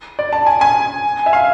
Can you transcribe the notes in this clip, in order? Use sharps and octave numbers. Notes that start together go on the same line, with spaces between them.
D5
A5
G#5
G#5
E5
F5